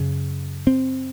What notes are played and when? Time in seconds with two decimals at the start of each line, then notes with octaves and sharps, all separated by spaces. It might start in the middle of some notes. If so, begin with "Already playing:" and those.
Already playing: F#2 C#3
0.67 C4